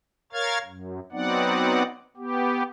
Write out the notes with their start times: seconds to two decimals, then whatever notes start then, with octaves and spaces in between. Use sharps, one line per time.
0.33 A#4 C#5 F5 F6 G#6 A6
0.64 F#2
1.12 F#3 B3 C4 D#4 D5 F#5
2.17 B3 G4